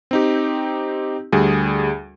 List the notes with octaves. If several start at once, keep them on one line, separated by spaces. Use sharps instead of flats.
C4 D#4 G4
D2 G3 G#4